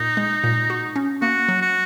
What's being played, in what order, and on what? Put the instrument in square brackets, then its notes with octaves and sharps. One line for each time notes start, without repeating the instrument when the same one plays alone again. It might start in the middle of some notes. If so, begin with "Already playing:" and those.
Already playing: [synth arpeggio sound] A#2 [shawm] D#4
[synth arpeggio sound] G#3
A#2
F#4
C#4
[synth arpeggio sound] A#3 [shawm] F#4
[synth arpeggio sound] F#3
[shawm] F#4